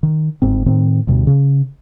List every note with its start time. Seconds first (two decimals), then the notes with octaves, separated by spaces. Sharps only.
0.03 D#3
0.42 G1 G#2 C4
0.66 A2 D#3 C4
1.07 D2 G2 B2
1.27 C#3